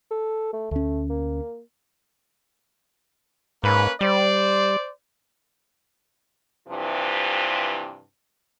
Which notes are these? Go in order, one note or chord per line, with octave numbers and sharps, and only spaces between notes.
A4
A3
D2 A3 C#4
A#3
G#2 A#3 C#4 B4
G3 C5 D5
G2 C3 E3 F3